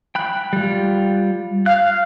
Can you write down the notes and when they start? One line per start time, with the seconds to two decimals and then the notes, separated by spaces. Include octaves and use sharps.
0.15 G5 B5 F#6
0.53 G3 F4
1.66 F5 F#6